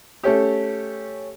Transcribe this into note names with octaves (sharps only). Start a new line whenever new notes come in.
A3 C#4 G4